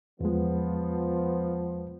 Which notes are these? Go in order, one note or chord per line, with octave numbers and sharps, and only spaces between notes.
E2 F3 G#3 B3